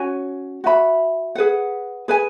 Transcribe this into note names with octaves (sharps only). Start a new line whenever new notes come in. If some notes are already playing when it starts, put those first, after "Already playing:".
Already playing: C#4 F#4 C#5 G#5
F#4 E5 G#5 B5
G#4 B4 F#5
G#4 B4 G#5